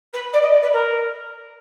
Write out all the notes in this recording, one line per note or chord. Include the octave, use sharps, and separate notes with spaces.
B4
D5
D#5
D5
B4
A#4